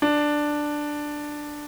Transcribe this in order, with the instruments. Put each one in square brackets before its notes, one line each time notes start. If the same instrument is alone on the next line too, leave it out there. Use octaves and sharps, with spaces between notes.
[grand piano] D4